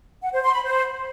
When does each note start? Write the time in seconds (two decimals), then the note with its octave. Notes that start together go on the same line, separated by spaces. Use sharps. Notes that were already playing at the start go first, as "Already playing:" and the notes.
0.22 F#5
0.33 C5
0.43 C6
0.53 B5
0.63 C5